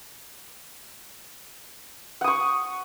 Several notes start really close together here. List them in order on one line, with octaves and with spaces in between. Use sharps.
F#5 D#6 C#6